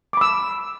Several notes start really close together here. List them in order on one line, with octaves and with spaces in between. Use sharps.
D6 B5 E6